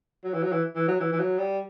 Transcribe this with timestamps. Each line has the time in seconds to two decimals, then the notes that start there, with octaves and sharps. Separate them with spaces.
0.24 F#3
0.34 E3
0.43 F#3
0.52 E3
0.75 E3
0.88 F#3
1.00 E3
1.12 E3
1.20 F#3
1.38 G3